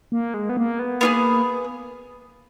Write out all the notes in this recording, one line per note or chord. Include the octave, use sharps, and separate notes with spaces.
A#3
G#3
B3
A#3
B3
A#3 B3 F4 G#4